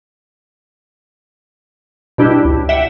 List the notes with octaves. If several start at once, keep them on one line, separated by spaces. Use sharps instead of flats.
B2 G3 D4 E4 G4
C#2
E5 F#5 G5